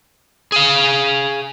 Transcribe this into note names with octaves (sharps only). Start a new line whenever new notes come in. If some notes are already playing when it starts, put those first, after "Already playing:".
G#4 F5